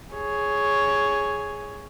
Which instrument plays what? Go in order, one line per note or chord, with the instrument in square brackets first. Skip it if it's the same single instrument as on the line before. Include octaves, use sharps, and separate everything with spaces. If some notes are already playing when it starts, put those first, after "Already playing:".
[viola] G#4 C#5